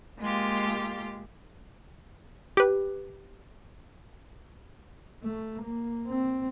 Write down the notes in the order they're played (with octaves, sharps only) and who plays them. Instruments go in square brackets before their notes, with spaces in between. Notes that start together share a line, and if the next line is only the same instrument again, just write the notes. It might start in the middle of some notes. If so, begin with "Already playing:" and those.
[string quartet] G#3 A#3 F4 G4
[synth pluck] G4 B4
[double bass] A3
A#3
C4